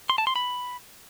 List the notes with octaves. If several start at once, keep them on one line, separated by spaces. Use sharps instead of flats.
C6
A5
C6
B5